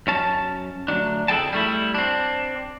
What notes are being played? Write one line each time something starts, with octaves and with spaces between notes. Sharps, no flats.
F#2 C#4 A5
D2 F#3 D4
F2 E4 G#4 A4 G5 A5
G3 A3 E4
C4 D4